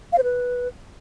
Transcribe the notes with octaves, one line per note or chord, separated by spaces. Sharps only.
F5
C5
B4